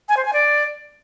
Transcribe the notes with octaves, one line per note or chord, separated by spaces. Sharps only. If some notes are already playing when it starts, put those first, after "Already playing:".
G#5
C5
G#5
D5